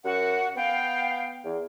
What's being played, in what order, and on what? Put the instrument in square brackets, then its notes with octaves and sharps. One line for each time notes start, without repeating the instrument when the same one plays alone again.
[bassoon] F#2 [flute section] F#4 F#5
[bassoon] B3 [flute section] F5 G5
[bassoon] E2